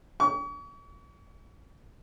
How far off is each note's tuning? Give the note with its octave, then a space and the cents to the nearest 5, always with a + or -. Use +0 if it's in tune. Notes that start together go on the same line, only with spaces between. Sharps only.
C#6 +40